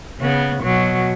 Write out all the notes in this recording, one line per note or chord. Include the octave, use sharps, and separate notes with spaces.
C#3 B3
B2 F#3